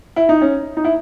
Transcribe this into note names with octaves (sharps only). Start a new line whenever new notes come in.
E4
D#4
C#4
D#4
E4